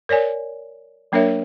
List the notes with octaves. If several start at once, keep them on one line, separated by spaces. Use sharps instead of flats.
A#4 C#5 D5 G#5
F#3 A#3 D4 A#4 C#5 E5